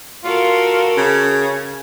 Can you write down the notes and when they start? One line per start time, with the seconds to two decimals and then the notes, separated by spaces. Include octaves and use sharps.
0.24 F4 F#4 A4 A#4
0.97 C#3